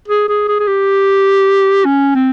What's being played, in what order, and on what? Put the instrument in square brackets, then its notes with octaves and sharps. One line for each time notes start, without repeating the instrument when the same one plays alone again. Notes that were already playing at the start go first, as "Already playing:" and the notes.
[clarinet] G#4
G#4
G#4
G#4
G4
C#4
C4